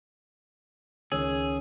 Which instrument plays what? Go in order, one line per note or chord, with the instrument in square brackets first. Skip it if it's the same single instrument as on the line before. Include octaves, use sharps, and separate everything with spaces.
[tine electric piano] C#2 D#3 C#4 [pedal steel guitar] G#4 [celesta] C#5 E6